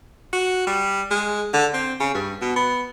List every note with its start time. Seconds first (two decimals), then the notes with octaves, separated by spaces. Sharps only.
0.33 F#4
0.67 G3
1.11 G#3
1.53 D3
1.74 C4
2.00 C#3
2.14 G2
2.41 B2
2.56 B3